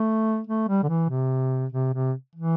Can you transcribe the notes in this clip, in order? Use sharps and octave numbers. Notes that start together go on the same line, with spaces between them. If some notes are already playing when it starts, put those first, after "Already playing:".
Already playing: A3
A3
G3
D3
E3
C3
C3
C3
E3